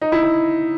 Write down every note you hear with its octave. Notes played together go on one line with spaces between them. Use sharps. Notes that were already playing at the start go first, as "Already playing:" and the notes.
D#4
E4
E4